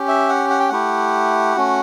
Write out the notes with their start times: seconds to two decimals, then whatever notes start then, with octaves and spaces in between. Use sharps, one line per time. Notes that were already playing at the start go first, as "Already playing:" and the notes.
Already playing: C#4 G4
0.08 E5
0.29 F#5
0.50 F#5
0.60 G5
0.69 A3 E4 G4 F#5
1.56 A3 C#4 F#4